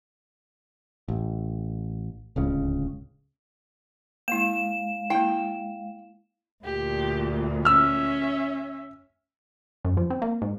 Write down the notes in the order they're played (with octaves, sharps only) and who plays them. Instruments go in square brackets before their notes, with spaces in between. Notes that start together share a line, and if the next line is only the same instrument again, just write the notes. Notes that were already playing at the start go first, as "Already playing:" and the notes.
[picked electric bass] A1
D1 C#2 C#3
[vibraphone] G#3 F5 [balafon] A#3 E4 [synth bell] E7
[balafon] A#3 E4 [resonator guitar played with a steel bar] G5
[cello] D2 A#2 [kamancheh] G4
[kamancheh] C#4 E5 [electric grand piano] E6 F6
[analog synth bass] F#2
F3
C4
A#3
G#2